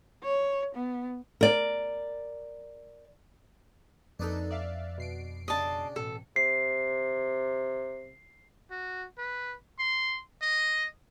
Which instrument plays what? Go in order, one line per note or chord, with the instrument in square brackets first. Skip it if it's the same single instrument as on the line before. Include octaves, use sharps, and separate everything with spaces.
[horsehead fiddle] C#5
B3
[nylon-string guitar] A#4 D5
[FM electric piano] F2 [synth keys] A#3 D#4 A4 [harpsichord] D4 B4 B5
[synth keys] D5 E5 F5
B2 C7 D7
[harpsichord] C#3 D4 C6 [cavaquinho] D#5 A5
[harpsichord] A1 [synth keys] B2 [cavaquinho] A4
[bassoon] C3 [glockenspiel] C7
[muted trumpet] F#4
B4
C6
D#5